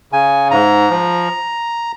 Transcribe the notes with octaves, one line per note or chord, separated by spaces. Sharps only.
C#3 G#5
G#2 A#5
F3